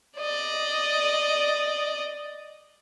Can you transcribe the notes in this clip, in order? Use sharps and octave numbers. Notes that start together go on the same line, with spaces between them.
D5 D#5